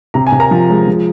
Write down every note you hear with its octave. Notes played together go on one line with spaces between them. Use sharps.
C3 A#5
G#5
C3
A#4 A#5
F3
G#3
F3